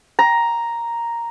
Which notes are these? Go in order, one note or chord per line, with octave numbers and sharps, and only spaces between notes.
A#5